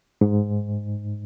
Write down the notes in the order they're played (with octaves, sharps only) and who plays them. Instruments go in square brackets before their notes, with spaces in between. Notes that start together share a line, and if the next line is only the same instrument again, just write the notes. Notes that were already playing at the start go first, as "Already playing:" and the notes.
[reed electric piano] G#2